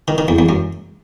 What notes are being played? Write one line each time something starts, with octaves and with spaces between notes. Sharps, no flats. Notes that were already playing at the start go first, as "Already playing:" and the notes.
D#3
D#3
E2
E2
F#2